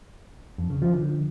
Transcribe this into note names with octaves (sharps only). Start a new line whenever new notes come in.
F2
C#3
F3
D3